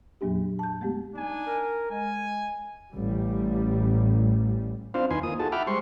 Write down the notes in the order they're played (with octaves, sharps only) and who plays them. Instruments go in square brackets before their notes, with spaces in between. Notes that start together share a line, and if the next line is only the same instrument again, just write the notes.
[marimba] F2 A#2 F#3 A#3 D4 G4
A5 G6
G#3 A3 B3 G4
[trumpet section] D4 G#5 [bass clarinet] D#4
[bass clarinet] A#4
[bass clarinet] G#3 [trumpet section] G#5
[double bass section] A1 G3
[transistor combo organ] C4 D4 F4 C5 F5
D#2 D#4 B4 G#5 C6
A#3 F4 D#6
D#4 F4 F#4 G#4 A4 A5
E5 F#5 G5 B5 D6 F6
G3 G#3 C5 C6 C#6